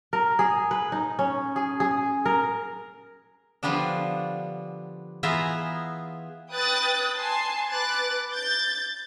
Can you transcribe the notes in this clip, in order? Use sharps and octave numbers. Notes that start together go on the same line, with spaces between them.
A#4
G#4
B4
D#4
C#4
G#4
G#4
A#4
D3 F3 G3 B3 D4
E3 B3 F4 G#4 E5 A#5
B4 G5 D#6 F#6 A6
G#5 A5 C6 C7
B4 D6 F#6 A6
G6 A6